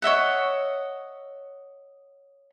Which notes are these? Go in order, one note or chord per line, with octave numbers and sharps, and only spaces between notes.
C#5 D#5 E5 F#5